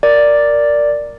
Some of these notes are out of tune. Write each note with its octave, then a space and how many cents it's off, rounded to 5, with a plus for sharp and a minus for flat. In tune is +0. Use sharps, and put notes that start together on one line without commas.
A#4 +0 D5 +0